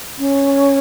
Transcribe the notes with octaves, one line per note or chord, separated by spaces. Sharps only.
C#4